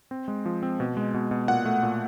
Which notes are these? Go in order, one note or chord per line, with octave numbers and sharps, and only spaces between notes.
C4
G#3
F3
C4
B2
G#3
B2
B2
A#2 F#5
A3
A#2